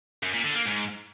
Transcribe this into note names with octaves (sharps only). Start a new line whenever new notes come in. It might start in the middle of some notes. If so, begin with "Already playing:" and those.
F#2
A#2
D3
A#3
G#2